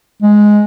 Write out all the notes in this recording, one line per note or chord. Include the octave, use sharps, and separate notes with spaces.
G#3